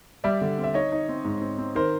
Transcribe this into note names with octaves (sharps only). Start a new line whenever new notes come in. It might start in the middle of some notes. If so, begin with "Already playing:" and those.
G3 D5 E5
D3
C4
E5
D#4 C#5 D#5
D#4
C4
G#2
C4
C4
D#3 A#4 C5